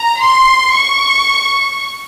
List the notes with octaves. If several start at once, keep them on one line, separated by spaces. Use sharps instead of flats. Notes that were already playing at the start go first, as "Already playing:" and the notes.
Already playing: A#5
C6
C#6